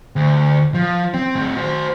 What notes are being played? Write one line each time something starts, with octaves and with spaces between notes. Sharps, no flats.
D2
F3
C4
A2 C4
F#4 C5